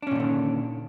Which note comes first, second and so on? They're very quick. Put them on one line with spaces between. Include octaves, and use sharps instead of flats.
D4 C#4 A#2 D#3 D3